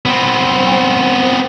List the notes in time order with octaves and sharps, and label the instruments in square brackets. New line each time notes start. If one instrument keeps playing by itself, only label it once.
[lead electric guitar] B3 C4